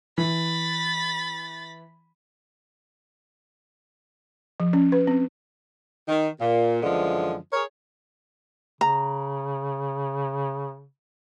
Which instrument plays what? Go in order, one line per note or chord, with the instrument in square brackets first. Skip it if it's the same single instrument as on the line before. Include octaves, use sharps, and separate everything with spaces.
[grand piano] E3 [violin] B5 A6
[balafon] F3
C#4
B4
C4
[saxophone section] D#3
A#2
F#2 D3 E3 F3 G#3
G#4 A#4 C#5
[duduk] C#3 [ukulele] A#5